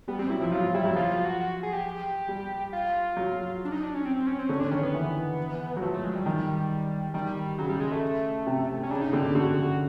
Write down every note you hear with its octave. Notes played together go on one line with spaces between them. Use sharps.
G3 B3
G3 C4
F#3 E4
F3 E4
F#3 F4
G3 E4
F#3
F3 F4
F4
F#4
F#4
G#4
G4
G3
F4
F#3
D4
D#4
D4
C#4
C4
C4
C#4
C4
D3 C#4
D4
D#3 C#4
B3
E3
F#3
F3 A3
A3
G#3
G3
D#3
D#3 G3
C#3 F#3
G3
G#3
A3
C3
C#4
C#3 D4
D#4
D3 G4
G4
D3 F#4